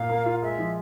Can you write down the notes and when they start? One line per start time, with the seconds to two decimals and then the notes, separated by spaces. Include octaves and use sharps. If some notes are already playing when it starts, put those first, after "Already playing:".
Already playing: A#2 F5
0.09 A#3
0.26 F4
0.42 G#3 E5
0.59 F3